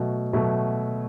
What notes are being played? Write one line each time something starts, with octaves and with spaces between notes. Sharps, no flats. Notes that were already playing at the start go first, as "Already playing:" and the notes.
Already playing: B2 F#3 A3
B2 F#3 A3